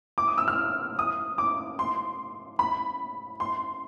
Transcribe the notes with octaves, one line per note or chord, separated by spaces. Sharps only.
D6
D#6
E6
F6
D#6
D6
C6
B5
C6